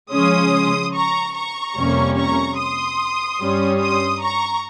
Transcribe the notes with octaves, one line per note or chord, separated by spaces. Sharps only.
C#3 F3 G#3 C#4 C6 D#6
A#5 C#6
A#5 C#6
F2 C3 G3 A#3 C#4
A#5 C#6
C6 D#6
G2 G3 C#4
C6 D#6
A#5 C#6